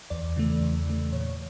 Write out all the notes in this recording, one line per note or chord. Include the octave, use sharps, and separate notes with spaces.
E2 D5
C#3 E3 A3
E2
C#3 E3 A3
A#2 C#5